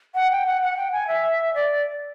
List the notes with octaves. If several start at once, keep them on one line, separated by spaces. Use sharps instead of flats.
F#5
G5
F#5
F#5
G5
G#5
E5
D5